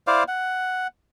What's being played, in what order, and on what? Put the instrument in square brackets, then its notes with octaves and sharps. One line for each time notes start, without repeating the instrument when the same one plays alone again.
[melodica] E4 C5 D5 F5
F#5